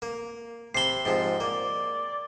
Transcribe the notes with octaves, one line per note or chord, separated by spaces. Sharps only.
A#3
C3 A5 B5 C7 G7
G#2 C3 F3
A#3 D5